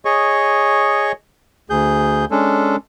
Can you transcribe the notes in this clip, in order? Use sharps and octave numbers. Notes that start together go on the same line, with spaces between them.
G#4 C#5 D#5 C#6
D2 G#4 G6
G#3 C#4 D4 A4